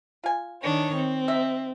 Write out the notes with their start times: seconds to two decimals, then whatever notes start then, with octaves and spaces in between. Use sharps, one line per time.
0.24 F4 G#5
0.62 D#3 D4 C#5
0.95 C4
1.28 D#4 E5